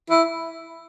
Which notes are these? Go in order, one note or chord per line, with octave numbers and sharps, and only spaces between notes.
E4